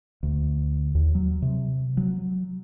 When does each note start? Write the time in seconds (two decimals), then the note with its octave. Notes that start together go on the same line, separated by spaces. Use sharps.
0.23 D2
0.95 D#2
1.15 F#3
1.42 C3
1.97 F#3